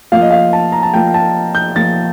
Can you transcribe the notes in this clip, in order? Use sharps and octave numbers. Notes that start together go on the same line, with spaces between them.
F3 A#3 F4 F5
D#5
F5
A5
A#5
A5
F3 A#3 F4 G5
A5
G6
F3 A#3 F4 A6